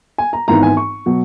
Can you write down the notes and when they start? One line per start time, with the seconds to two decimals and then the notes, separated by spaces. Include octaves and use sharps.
0.18 G#5
0.33 A#5
0.48 G#1 G#2 E3 B3 A#5
0.63 G#5
0.77 C#6
1.06 B2 F#3